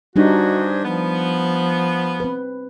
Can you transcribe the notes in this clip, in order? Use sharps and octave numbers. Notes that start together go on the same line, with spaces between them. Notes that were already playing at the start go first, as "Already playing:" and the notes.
G2 G3 D4 D#4 F#4 G#4 C5
F3 B3
C4 B4